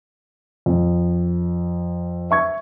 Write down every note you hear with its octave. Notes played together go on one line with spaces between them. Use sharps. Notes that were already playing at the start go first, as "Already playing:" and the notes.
F2
E5 C#6 G#6